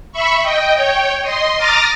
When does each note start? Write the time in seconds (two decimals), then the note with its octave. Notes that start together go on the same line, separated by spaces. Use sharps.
0.12 E5 B5 C#6
0.42 D#5 G5
0.73 C#5 G5
1.21 D#5 C6
1.57 A#5 D6 D#6 F6 A6 A#6